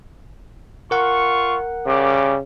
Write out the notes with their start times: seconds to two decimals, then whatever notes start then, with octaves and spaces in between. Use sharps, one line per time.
0.91 F4 A#4 F#5 C#6
1.87 C#3 G3 D6